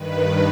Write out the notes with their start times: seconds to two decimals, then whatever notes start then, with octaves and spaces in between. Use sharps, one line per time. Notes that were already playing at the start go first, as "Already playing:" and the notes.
Already playing: G2 D#3 B4